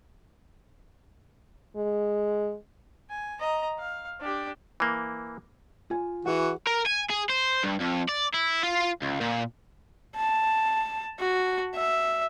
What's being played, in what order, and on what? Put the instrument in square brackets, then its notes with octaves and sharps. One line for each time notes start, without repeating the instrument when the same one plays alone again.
[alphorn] G#3
[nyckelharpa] G#5
D#5 A#5
F5
D4 G4
[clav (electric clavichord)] E3 A#3
[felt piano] F4 G#5
[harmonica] E3 F#4 [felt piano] G#4 F#5
[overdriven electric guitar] A#4
G#5
G#4
C5
G2
F2
D5
E4
F4
C#2
A#2
[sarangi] A5
F#4
E5